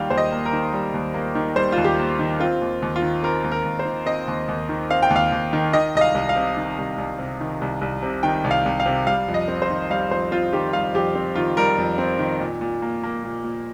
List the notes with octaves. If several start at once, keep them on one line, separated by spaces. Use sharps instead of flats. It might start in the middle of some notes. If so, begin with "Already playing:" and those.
Already playing: D#2 D#3 G3 A#3 F5 G5
D#2 C5
D#5
A#3
A#4
D#3
G3
D#2
A#3
D#3
G3 C5
F4
D#2
G4
A#3
D#3
C4 F4
D#2
D#2
F4
D#3
C4 A#4
D#2
A#4
D#2
C5
D#3
C4 D#5
D#2
D#2
D#3
C4 F5
G5
D#2
F5
D#2
D#3
D#3 D#5
C2 D#5
F5
C2
F5
C3
D#3
C2
C2
C3
D#3
C2
C2
C3
D#3 G5
C2
F5
C2
F5
C3
G3 F5
F2
D#5
C4
C5
D#3
G3 F5
F2 C5
C4 F4
D#3 G4
G3 F5
F2 G4
C4
D#3 F4
G3 A#4
F2
C4
D#3
A#2
A#2
A#3
A#3
A#2
A#2